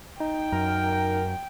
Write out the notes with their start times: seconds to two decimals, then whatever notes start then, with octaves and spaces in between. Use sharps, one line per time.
0.20 D#4 G5
0.52 F#2 A#4